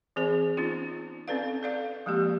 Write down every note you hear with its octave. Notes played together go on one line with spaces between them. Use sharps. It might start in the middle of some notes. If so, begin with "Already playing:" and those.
E3 C4 G#4 C5
B3 C#4 D#4 F4
C4 C#4 A4 B4 D5 F5
A4 D5 F5
F3 G#3 A#3 G4